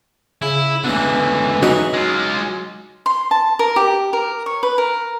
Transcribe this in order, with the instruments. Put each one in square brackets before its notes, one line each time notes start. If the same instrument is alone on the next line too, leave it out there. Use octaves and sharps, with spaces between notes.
[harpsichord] C#3 [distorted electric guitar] E4
[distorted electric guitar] C#2 D3 [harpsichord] B2 A3 [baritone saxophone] E3
[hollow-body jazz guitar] F#3 D#4 F#4 [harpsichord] G#4 C#5 D#5
[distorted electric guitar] G#3 F4
[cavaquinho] C6
A5
A#4
G4
A#4
C#5
B4
A#4